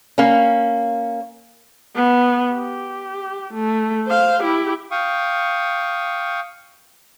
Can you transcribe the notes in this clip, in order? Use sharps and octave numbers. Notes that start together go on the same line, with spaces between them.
A#3 C#4
B3
G4
A3
C5 F5
E4 G4
F5 G5 C#6 D#6